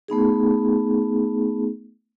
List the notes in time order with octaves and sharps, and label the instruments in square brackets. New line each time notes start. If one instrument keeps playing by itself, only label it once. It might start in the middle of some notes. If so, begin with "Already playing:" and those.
[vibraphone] A3 B3 D#4 G#4